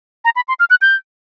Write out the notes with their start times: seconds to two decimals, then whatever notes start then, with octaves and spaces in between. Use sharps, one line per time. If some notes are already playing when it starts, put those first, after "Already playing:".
0.25 A#5
0.36 B5
0.48 C6
0.60 F6
0.70 F#6
0.82 G6